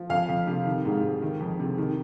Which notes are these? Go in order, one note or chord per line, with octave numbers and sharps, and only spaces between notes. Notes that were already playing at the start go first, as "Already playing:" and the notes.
Already playing: F3
F2 F5
F2
C3
D#3
G#2
G#2
D#3
F2
C3
D#3